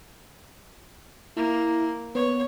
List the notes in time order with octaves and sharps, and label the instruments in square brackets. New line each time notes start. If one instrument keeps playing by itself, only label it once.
[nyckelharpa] A#3 [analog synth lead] E4
[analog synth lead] B3 [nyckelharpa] C#5